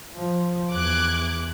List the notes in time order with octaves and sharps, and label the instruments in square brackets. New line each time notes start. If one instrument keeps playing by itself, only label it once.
[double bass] F3
[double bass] E2 [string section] D6 F#6 G#6